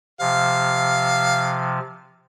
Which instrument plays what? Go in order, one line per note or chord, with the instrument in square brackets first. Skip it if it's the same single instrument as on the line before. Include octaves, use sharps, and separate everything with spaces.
[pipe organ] C3 F3 [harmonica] F5